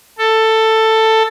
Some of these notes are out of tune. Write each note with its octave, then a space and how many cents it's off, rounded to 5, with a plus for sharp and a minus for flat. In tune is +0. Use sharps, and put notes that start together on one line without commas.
A4 +10